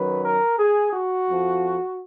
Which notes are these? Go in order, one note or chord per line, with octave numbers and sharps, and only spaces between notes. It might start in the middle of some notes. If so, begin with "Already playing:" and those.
Already playing: F#2 D#3 F#3 B4
A#4
G#4
F#4
F2 F3